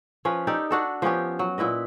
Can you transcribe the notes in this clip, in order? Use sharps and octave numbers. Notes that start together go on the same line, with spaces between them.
F3 C#4 B4
D#4 G4 A4 D5
D4 F#4 A4
F3 B3 C#4 G4
F#3
A#2 E4 B4 D#5